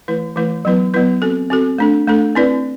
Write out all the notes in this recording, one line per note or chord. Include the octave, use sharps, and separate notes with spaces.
E3 A3 E4 B4
E3 A3 E4 B4
F#3 B3 E4 B4
F#3 B3 E4 B4
C4 F#4 A4
C4 F#4 A4
A3 D4 A4
A3 D4 A4
C4 E4 B4 D5